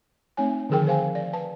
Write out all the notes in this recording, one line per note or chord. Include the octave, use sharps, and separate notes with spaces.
A3 C4 D#4 C#5 G#5
D3 D#3 F3 G#4 A#4 G5
A#4 C5 F5 G#5
D5
B4 A5